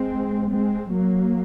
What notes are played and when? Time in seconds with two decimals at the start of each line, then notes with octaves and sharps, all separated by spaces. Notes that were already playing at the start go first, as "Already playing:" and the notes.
Already playing: G#3 C4
0.49 G#3 C4
0.91 F#3 A#3